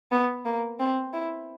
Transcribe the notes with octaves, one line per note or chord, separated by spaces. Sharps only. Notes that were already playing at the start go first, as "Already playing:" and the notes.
B3
A#3
C4
E4